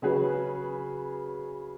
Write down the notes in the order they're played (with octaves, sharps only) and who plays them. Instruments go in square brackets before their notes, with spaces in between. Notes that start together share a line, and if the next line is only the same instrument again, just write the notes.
[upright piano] C#3 F#3 C#4 G#4 B4